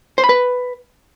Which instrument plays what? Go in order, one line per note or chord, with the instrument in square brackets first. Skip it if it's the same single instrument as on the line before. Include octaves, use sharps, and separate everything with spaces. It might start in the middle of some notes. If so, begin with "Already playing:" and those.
[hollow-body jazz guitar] C5
B5
B4